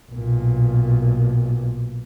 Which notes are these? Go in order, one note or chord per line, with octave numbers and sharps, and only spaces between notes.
B1 A#2